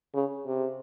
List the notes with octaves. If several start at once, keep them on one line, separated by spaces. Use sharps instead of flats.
C#3
C3